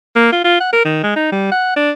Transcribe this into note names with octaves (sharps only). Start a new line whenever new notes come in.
A#3
F4
F4
F#5
A#4
D#3
G#3
D#4
G3
F#5
D4